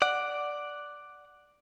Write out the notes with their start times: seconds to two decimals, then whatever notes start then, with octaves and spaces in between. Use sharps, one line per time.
0.02 D5 F#5